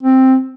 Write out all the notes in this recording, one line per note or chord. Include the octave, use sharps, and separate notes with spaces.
C4